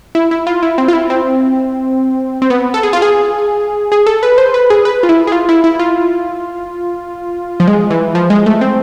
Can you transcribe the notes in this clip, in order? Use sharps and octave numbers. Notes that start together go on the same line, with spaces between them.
E4
E4
F4
E4
C4
F4
E4
C4
C4
B3
A4
G#4
F4
G#4
G#4
A4
B4
C5
B4
G#4
B4
F4
E4
G#4
F4
E4
E4
F4
F3
G#3
E3
F3
G#3
A3
C4